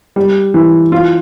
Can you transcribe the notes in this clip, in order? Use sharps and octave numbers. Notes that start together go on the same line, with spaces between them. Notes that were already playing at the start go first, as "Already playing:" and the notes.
G3
E3
F4